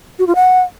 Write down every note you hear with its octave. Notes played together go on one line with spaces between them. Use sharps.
F#4
F4
F#5